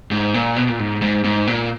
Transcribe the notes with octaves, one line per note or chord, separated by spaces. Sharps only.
G#2
A#2
B2
A#2
G#2
G#2
G#2
A#2